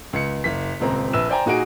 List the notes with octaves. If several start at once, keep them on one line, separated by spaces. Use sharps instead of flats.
C#2 C#7
F#1 B6
D#1 C#2 C4 A#5
A#1 B4 E6 E7
C5 D5 G5 G#5 A#5
A#2 D#4 F#4 G#4 D7